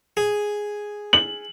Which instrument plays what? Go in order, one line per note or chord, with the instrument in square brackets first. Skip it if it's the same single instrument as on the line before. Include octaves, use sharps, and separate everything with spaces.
[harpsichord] G#4
[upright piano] F#7